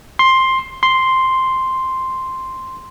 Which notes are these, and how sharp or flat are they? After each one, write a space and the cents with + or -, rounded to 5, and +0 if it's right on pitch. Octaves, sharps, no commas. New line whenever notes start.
C6 +10
C6 +0